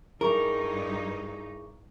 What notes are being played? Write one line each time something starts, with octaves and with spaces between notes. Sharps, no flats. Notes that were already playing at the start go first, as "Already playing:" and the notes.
G2 D#4 E4 G#4 A#4 C#6